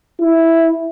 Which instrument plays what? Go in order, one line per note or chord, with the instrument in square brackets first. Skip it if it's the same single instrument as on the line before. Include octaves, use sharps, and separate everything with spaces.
[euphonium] E4